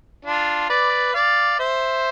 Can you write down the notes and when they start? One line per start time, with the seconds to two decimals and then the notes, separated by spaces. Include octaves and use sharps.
0.25 D4 F4
0.69 B4 D5
1.14 D5 F5
1.59 C5 E5